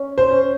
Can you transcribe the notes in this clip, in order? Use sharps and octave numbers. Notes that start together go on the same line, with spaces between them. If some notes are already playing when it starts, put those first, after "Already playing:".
Already playing: C#4
C5
C#4